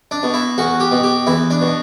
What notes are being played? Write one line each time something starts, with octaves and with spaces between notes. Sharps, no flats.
D4
B2
E4
E2 F#4
G4
B2
G4
E2 E4
D4
B2